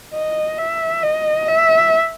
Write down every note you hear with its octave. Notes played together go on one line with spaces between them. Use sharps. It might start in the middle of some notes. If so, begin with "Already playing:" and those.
D#5
E5
D#5
E5